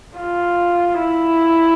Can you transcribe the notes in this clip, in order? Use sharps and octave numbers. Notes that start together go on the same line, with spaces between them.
F4
E4